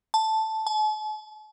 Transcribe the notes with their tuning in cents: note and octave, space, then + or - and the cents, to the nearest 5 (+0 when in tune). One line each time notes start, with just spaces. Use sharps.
A5 +0
A5 -45